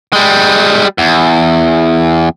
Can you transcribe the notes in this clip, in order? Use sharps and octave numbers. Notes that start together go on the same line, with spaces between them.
G3 G#3
E2